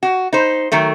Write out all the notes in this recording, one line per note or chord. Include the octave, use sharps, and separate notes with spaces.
F#4
D#4 C5
D#3 F#3 A3